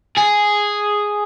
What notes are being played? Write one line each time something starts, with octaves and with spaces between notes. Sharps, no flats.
G#4